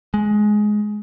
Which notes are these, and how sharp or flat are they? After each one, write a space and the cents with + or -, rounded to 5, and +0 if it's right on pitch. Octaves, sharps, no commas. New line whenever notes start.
G#3 +15